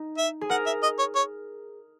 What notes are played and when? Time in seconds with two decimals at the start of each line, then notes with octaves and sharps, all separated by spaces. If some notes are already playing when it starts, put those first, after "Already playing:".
Already playing: D#4
0.18 E5
0.41 G#4
0.50 A#4 F#5
0.66 E5
0.83 D#5
0.99 C#5
1.15 C#5